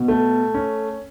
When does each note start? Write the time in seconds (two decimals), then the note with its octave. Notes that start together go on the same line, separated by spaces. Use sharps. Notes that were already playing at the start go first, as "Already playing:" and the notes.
Already playing: B2
0.08 A3
0.54 C#4